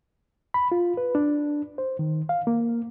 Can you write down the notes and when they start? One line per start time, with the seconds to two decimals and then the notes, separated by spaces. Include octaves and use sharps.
0.54 B5
0.72 F4
0.97 B4
1.15 D4
1.78 C5
1.99 D#3
2.29 F5
2.47 A#3